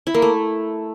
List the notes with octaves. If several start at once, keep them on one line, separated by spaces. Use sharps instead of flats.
E4
A#3
A3